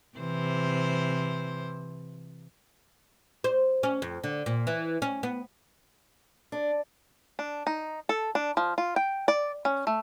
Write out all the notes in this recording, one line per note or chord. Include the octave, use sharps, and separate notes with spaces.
C3 E3 C5
C5
C#4
F2
D3
A#2
E3
C#4
B3
D4
D4
D#4
A4
D4
F3
F4
G5
D5
C#4
A3